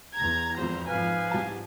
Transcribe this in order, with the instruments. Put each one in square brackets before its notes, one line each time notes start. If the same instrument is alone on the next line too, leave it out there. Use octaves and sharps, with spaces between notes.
[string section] E2 A#5 [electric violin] G#6
[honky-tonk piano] G#1 F2 [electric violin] C5
[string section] G#2 F3 [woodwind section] B4 F5 [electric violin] G#5
[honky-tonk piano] C2 A5